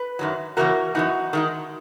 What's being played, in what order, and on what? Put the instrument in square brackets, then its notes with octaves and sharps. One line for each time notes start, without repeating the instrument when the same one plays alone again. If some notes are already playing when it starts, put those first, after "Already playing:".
Already playing: [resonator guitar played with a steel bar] B4
F#2 D#3 F#3
C#3 E3 A#3 C#4 F#4 A#4
F#2 E3 B3 D#4 F#4
D#3 G#3 D#4